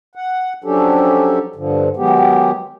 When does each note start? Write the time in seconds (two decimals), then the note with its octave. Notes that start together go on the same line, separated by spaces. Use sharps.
0.15 F#5
0.64 F3 F#3 C#4 D4 G4 A4
1.56 G2 D3 F3
1.97 D#3 F#3 G#3 B3 G4